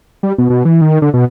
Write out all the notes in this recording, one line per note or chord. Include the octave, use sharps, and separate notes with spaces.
G3
B2
B2
E3
D#3
D3
B2